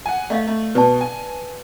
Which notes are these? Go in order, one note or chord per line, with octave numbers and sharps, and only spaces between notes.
F#5 G#5
A3 D5 D#5 F5
A3
B2 B4 D5 A5
G#5